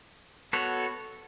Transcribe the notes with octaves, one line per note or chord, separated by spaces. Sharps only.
B3 F#4 A4 C#5